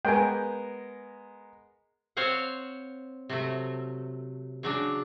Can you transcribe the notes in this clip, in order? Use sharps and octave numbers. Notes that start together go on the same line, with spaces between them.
G#3 B3 A#4 G5 G#5
C4 C5 C#5 F5 F#5
C3 F#3 A3
C#3 F#3 D4